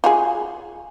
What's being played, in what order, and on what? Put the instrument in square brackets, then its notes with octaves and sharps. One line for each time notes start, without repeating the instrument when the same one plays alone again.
[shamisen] F4 F#4 G#4